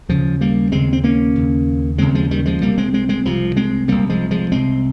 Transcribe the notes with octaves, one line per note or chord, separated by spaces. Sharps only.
D#2 C#3 F3
G3 A#3
D#2 C#3 G#3 C4
C4
A#3 C#4
D#2 C#3
D#2 C#3 G#3 C4
F3 G#3
D#3 G3
F3 G#3
C2 C3 G3 A#3
G#3 C4
G#3 C4
G#3 C4
C2 C3 F3
G#3 C4
C2 C3 G3 A#3
F3 G#3
F3 G#3
C2 C3 G#3 C4